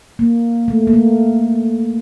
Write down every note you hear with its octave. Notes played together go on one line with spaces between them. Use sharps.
A#3
A3
A#3
A3